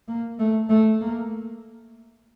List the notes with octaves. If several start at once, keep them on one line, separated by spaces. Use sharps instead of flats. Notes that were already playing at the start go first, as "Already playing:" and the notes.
A#3
A3
A3
A#3